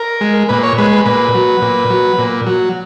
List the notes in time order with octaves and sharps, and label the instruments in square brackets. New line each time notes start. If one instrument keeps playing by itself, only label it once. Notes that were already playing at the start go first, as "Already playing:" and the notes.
Already playing: [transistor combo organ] A#4
G#3
A#2 B4
C#5
G#3 B4
B4
A#2 B4
F#3
A#2
F#3
A#2
F#3